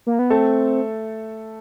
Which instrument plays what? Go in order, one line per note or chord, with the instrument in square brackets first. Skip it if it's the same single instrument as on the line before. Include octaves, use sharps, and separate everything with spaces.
[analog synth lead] A#3
B3
[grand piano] A3 A4 [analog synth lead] C4